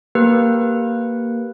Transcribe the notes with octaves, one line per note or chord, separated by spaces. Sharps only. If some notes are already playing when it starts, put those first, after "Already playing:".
A#3 G4 A#4 B4